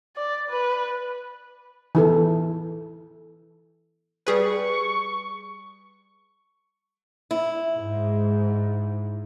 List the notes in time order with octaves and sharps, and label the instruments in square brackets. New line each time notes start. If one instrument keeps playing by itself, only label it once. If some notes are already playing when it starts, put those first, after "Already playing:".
[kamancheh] D5
B4
[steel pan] E3 E4 A4
[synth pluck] G3 G#4 B4 [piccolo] C#6
[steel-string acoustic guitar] E4
[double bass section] G#2